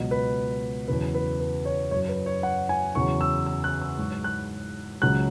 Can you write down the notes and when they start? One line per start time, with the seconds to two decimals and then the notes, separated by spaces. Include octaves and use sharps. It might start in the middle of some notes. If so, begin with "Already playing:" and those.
Already playing: C#2 B2 F#3
0.11 B4
0.88 E2 C#3 F#3 B4
1.15 B4
1.40 B4
1.65 C#5
1.91 F#2 F#3 C#5
2.09 B4
2.26 C#5
2.43 F#5
2.69 G#5
2.95 E2 C#3 F#3 C#6
3.21 E6
3.46 E6
3.64 F#6
3.81 E6
3.98 G#2 F#3 C#6
4.24 F#6
5.02 C#2 C#3 F#3 F#6